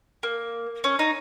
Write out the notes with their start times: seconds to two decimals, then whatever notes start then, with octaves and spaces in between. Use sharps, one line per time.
0.23 A#3
0.84 C#4
0.99 D#4